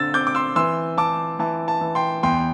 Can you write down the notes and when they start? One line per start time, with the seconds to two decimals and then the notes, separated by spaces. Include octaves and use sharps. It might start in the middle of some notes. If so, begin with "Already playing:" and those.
Already playing: D3 C4 E6 A6
0.14 C4 D6 G6
0.27 D6
0.35 C6 E6
0.56 E3 C6 E6
0.98 E3 A5 D6
1.39 E3 A5
1.68 A5
1.81 E3
1.95 G5 C6
2.23 E2 G5 C6